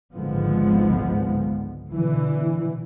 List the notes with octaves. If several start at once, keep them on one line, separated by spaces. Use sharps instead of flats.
G#1 C#2 D3 F3 G#3 B3
B2 D3 E3